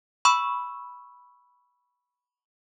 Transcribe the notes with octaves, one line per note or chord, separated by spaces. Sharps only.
B5 C#6 E6